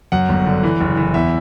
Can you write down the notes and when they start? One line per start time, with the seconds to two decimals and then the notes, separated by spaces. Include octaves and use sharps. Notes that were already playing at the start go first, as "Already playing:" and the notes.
0.12 F#2 F#5
0.29 G1
0.46 D3
0.63 E3
0.81 F#1
0.97 E3
1.14 E2 E5